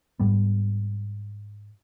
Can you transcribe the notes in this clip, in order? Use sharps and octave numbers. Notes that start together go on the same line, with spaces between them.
G#2 G3 B3